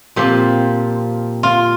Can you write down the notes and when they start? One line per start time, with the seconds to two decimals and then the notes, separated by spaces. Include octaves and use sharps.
0.16 A#2 F3 C4 G4
1.43 F4